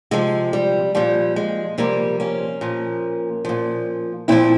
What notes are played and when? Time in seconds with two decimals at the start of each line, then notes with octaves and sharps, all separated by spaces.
0.11 C3 F3 G#3
0.53 G3
0.95 A#2 F3 G3
1.36 G#3
1.78 C3 F3 G3 A#3
2.20 A#3 C#4
2.61 A#2 F3
3.45 A#2 F3
4.28 A#2 F3 C4 E4